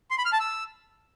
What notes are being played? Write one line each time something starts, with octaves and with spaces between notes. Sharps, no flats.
C6
B5
F6
A5
E6